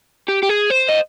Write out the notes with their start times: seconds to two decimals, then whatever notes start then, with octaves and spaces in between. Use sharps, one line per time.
0.28 G4
0.43 G4
0.49 G#4
0.70 C5
0.89 D#5